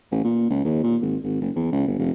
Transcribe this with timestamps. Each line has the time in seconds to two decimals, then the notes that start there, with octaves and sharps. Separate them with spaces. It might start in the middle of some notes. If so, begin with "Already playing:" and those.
0.11 A1
0.24 A#2
0.50 C#2
0.65 D#2
0.83 A#2
1.02 G#1
1.23 G#1
1.41 F#1
1.56 E2
1.72 C#2
1.87 G1
1.99 F1